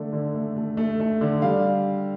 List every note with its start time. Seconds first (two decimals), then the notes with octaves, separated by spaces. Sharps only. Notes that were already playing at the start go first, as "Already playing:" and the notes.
Already playing: D3 A3
0.13 D3
0.35 A3
0.56 A3
0.77 A3
1.00 A3
1.21 D3
1.42 G3 F5